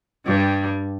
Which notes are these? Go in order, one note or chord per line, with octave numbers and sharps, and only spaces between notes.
G2 G3